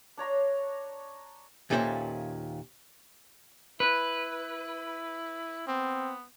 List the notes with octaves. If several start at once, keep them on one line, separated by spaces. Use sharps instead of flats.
D4 C#5 A#5 C6
D#2 A#2 C#4 A4 C5 E5
E4 B4
B3 C4